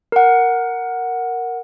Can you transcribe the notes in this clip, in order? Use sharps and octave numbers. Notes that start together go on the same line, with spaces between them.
A#4 F#5